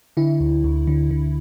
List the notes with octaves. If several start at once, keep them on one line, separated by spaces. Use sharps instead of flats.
D3 E4
D2
D2
D3
D3